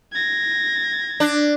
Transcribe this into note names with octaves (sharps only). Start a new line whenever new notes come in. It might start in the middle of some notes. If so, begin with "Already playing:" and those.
G#6 A#6
D4